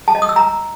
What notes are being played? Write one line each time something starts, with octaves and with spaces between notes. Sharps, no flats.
A5
D#5
D#6
E6
A#5